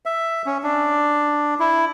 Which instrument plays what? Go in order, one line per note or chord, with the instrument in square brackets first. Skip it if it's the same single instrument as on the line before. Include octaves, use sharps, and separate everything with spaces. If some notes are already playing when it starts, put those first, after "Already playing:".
[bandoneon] E5
C#4
D4
E4